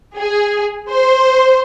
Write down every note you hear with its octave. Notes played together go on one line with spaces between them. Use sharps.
G#4
C5